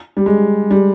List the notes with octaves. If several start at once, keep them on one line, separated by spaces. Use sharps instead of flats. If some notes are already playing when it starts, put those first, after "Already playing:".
G3
G#3
G3